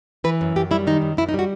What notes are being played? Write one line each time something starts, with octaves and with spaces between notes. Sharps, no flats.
E3 B4
F#2
F#2 G4
G3 E4
D#3 D#4
F#2
F#2 E4
D#4
G3 F#4